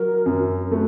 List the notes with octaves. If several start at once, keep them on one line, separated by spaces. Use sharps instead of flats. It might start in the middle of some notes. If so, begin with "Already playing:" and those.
Already playing: F#3 A#4
F#2
A3 B4